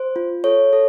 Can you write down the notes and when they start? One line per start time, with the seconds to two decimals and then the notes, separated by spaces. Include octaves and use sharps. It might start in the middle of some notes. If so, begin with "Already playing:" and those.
Already playing: C5
0.16 F4
0.44 A4 C#5
0.73 A4